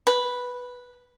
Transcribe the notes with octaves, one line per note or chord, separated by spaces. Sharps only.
B4